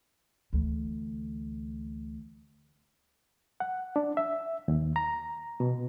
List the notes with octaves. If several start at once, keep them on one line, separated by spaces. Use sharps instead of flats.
D2 E3
F#5
D4
E5
D#2
A#5
B2